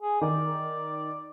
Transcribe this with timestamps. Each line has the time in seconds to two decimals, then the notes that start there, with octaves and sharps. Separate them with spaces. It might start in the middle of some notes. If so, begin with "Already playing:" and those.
0.02 G#4
0.21 D#3 D5